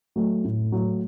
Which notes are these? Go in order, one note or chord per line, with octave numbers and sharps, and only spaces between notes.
F#3 A3
A2
F#3 A3